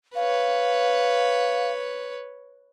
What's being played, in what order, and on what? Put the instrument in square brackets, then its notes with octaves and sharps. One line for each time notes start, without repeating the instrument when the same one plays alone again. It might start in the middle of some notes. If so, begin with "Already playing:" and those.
[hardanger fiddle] B4 C#5 [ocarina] F5